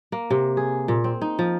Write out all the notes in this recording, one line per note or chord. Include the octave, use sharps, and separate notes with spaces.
A#3
C3
G#4
A#2
C4
D#4
F3